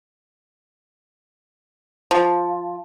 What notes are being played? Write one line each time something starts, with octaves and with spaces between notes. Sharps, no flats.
F3